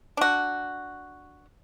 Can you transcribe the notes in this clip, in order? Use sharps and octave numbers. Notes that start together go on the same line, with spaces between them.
D4 F#4